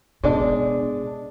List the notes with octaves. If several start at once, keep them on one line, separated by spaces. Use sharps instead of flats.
B2 G#3 D4 D5